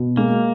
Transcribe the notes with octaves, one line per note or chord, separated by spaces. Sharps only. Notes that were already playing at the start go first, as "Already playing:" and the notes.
Already playing: B2
G#3 A#3